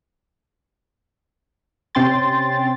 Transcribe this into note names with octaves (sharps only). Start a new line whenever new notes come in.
C3 C4 C#4 G5 C6 A6